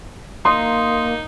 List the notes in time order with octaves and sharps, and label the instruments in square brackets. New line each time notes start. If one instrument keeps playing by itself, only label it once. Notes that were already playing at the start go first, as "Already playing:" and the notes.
[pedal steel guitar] A#3 [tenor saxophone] D#4 [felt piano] C6 D#6